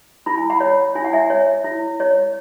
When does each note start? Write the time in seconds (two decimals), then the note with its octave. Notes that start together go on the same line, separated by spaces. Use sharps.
0.26 E4 B5
0.37 G#5
0.50 F#5 B5
0.60 C#5
0.95 E4 G#5
1.04 F#5
1.13 E5 G#5
1.30 C#5
1.64 E4
2.00 C#5